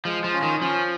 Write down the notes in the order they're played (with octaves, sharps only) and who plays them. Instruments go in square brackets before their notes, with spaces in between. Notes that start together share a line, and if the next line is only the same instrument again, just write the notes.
[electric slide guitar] F3 [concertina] G#3
[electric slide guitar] F3
[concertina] C#4 F4
[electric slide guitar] D#3
[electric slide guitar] F3 [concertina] C#4